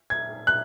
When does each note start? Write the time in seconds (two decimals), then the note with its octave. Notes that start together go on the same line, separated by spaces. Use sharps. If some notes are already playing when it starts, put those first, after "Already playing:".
0.10 G#6
0.47 F#6